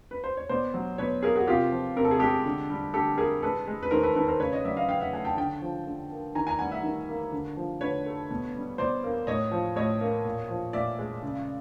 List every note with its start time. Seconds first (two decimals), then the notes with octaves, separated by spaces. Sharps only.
0.11 B4
0.24 C5
0.37 C#5
0.49 B2 C5 D5
0.74 F#3
0.98 B2 B4 C#5
1.23 A#3 G#4 A#4
1.35 F#4 G#4
1.48 C3 F4 G4
1.71 F3
1.96 C3 A#4
2.05 A4
2.11 G#4
2.19 G#3 G4 A4
2.45 D3
2.70 G3
2.94 D3 G4 A4
3.18 A#3 G#4 A#4
3.42 G#3 A4 B4
3.68 G#3
3.83 B4
3.91 D#3 A#4 C5
4.03 A4 B4
4.15 D#3 A4 B4
4.28 A#4 C5
4.40 C#3 B4 C#5
4.52 C#5 D#5
4.65 F#3 D5 E5
4.77 D#5 F5
4.89 C#3 F5 G5
5.00 E5 F#5
5.13 A3 F#5 G#5
5.25 G5 A5
5.37 D3 G5 A5
5.62 F3
5.87 D3
6.11 A#3
6.35 D#3 G#5 A#5
6.47 G#5 A#5
6.59 G3 F#5 G#5
6.72 E5 F#5
6.83 D#3
7.09 A#3
7.32 D3
7.57 F3
7.81 D3 B4 C#5
8.06 A3
8.31 B2
8.55 G3
8.78 B2 C5 D5
9.04 A#3
9.27 A2 C#5 D#5
9.51 F3
9.76 A2 C#5 D#5
10.01 A#3
10.25 A#2
10.49 F3
10.73 A#2 D5 E5
10.99 G#3
11.23 C#3